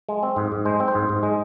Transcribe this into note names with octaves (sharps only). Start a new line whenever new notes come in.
G#3
C4
G#2
G#2
G#3 C5
C4
C5
G#2
G#2
G#3